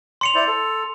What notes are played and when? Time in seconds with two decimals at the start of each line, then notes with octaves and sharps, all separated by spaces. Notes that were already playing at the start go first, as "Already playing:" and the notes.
0.21 C6 C#7 F7
0.35 E4 C5 D5
0.47 A4